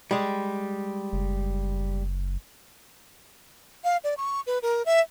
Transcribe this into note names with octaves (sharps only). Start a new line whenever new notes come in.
G3 G#3
F#1
F5
D5
C#6
B4
A#4
E5